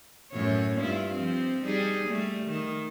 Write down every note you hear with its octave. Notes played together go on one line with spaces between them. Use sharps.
F#2 A2 C#5
G2 E4 F4
F3 C4
G3 D#4 G#4
G3 A3
D#3